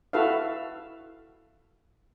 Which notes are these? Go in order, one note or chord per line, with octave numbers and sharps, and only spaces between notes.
E4 F#4 A4 B4 E5 F5